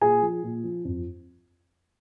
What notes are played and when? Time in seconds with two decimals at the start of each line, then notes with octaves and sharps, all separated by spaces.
0.01 A#2 G#4 G#5
0.22 F3
0.43 A#2
0.64 F3
0.85 F2